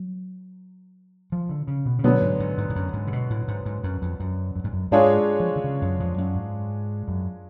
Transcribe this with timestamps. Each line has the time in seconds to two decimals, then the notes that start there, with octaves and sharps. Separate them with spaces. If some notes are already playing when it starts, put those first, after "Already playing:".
Already playing: F#3
1.32 F3
1.49 D3
1.67 C#3
1.86 B2
1.99 C#3
2.04 B2 D3 F#3 B3
2.22 G#2
2.40 G#2
2.58 G#2
2.70 G#2
2.76 F#2
2.93 G#2
3.07 C#3
3.12 B2
3.30 A2
3.48 G#2
3.65 G#2
3.83 F#2
4.02 F2
4.20 F#2
4.56 F#2
4.64 G#2
4.73 F#2
4.91 G#2 G#3 D4 F4 G#4 C#5
5.40 F3
5.56 D3
5.64 C#3
5.82 F#2
6.00 F2
6.18 F#2
6.35 G#2
7.08 F#2